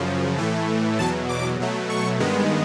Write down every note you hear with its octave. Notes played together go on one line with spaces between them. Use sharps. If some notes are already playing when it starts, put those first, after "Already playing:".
Already playing: F#2 C#3 F3
A2 E3 A3
E2 B2 F#3 A5
D6
B2 F#3 A3
C#6
G2 D#3 G#3 B3